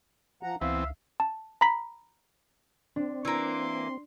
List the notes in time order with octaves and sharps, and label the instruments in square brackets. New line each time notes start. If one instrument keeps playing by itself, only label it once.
[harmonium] F3 F#5 A#5
[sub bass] C#2 [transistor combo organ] E3 B3 C4 [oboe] E5 [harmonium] F5
[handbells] A5
A#5 B5 B6
[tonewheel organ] C4 [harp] D4
[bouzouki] E3 A#3 [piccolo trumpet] C6